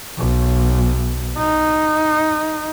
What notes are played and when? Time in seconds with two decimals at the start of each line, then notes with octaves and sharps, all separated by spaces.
0.18 B1
1.38 D#4